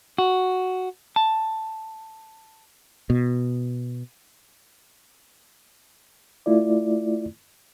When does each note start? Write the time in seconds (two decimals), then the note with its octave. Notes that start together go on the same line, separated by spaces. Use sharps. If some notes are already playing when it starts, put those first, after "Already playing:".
0.18 F#4
1.16 A5
3.10 B2
6.46 A3 E4 F4 D5